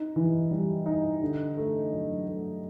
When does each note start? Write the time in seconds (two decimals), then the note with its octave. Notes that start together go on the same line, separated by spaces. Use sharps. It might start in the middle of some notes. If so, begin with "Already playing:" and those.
Already playing: D#4
0.16 E3
0.51 G3
0.86 D#4
1.22 D3
1.57 A3
1.92 F#3
2.27 A3